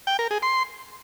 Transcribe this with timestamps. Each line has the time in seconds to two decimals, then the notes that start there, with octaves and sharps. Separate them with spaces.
0.07 G5
0.19 A#4
0.31 G#4
0.42 C6